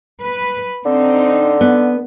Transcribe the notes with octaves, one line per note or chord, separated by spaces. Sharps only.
B4
D3 C4 D#4
B3